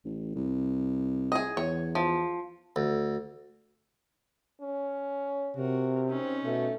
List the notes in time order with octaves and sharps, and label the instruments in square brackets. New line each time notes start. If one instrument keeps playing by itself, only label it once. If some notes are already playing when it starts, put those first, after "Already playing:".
[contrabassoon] A1
C2
[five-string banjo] G#4 D#5
[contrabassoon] E2 [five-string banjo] C#5
[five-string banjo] F3
[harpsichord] D2
[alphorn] C#4
[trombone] C3 [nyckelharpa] F#4 A#4
[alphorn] C4 [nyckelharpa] C#4 D#4
[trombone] B2 [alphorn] A3